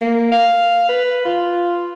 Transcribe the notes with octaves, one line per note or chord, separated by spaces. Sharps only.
A#3
F5
B4
F4